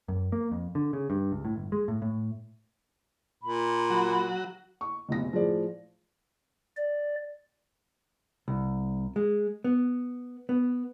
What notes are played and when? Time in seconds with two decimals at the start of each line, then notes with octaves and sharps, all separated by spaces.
0.08 F#2
0.32 A#3
0.51 F2
0.75 D3
0.93 C#3
1.10 G2
1.31 C#2
1.45 A2
1.56 G1
1.72 G#3
1.88 A2
2.02 A2
3.42 A#2 B5
3.90 F#3 F#4
4.81 C#6
5.09 F1 B1 A#6
5.32 A2 F3 G#4 D5
6.77 D5
8.48 C2
9.16 G#3
9.64 B3
10.49 B3